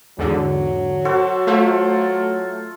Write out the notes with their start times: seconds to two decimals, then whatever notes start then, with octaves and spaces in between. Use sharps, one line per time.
0.18 E2 G#2 D3 F#3
1.05 F#4 A4 C5
1.47 A3 F4 C5